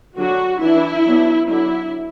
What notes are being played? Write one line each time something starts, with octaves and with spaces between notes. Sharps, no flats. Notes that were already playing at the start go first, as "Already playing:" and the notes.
D3 F#3 D4 F#4
E3 D4 E4
F#3 B3 D4
D3 F#3 D4 E4